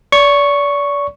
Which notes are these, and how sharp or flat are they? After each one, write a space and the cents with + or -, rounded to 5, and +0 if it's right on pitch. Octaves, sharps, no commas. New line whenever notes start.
D5 -35 C#6 +0